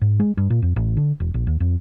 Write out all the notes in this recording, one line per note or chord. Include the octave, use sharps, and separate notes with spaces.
G#2
G#3
G2
A#2
F2
A1
D3
E1
A#1
D#2
F2